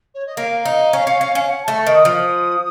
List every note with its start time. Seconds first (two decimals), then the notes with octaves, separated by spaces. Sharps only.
0.14 C#5
0.26 D#5
0.37 A#3 F5
0.65 D#4
0.93 C#4
1.07 C#4
1.21 C#4
1.35 C#4
1.49 F#5
1.62 A5
1.68 A3
1.77 C#6
1.87 D#3 D#6
2.05 F3